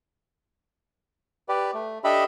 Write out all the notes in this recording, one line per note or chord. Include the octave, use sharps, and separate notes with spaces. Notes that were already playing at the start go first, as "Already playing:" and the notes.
G4 B4 D5
A3
D4 G4 A4 D#5 E5 B5